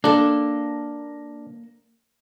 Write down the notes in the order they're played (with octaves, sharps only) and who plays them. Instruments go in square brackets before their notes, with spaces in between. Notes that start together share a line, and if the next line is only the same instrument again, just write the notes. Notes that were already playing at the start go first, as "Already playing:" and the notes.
[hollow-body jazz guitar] A#3 A4 [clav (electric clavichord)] D4